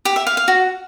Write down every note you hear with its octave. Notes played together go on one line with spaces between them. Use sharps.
G4
E5
F5
F5
F#4